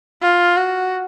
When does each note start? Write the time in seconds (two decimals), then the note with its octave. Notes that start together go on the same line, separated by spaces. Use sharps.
0.22 F4
0.57 F#4